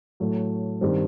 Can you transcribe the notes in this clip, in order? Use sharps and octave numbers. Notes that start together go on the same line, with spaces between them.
A2 F#3 A3
G2 D#3 G3 C4